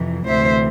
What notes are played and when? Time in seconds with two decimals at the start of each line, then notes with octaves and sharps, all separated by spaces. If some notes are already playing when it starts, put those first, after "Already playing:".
Already playing: F2 C3 E3
0.28 D2 C3 E3 C5 E5